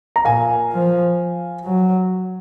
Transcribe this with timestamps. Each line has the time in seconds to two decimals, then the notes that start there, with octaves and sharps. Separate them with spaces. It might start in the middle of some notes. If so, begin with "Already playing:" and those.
0.16 A#5
0.25 A#2 F5 G#5
0.72 F3
1.65 F#3